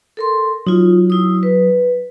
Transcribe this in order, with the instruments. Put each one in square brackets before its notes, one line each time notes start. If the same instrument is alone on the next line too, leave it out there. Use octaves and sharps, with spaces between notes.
[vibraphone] A4 A#4 C6
[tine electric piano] F#3 [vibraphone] D#4 F4
[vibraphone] E4 D#6
B4